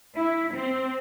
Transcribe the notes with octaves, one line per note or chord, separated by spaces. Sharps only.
E4
C4